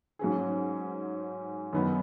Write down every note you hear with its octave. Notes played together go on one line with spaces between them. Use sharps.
G#2 F#3 C#4 G#4
F#2 D#3 B3 D#4